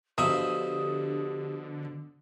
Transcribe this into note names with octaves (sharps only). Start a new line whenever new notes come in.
B2 D3 F3 G4 E5 D#6